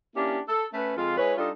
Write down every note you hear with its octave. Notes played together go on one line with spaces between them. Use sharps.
A#3 C#4 D4 E4 G4
A4
A3 C#4 B4
F2 G#3 F4
G#3 E4 B4 C#5
G3 D4 D#4 F4 A4